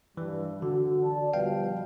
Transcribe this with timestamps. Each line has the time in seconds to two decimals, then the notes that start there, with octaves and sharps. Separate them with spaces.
0.17 G2 E3
0.62 D3 F#4
1.04 D5 A5
1.33 B2 F3 G3 F5 G5